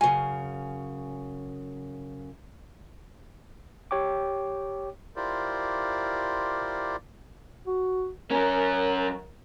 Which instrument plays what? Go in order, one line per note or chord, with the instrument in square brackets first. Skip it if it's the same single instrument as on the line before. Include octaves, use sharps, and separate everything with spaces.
[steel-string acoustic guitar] F#2 C#3 [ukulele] G#5
[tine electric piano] G4 C#5 G5 D6
[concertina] E4 F4 G4 A#4 C5 D5
[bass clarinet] F#4
[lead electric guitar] F#3 C#4 [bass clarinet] A#4